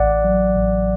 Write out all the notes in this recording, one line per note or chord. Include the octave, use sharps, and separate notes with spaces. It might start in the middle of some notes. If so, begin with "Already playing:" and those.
Already playing: A1 A2 D5 F#5
F#3
A1